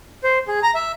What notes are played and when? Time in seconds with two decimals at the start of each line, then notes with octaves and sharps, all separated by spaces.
0.24 C5
0.48 G#4
0.63 A#5
0.75 E5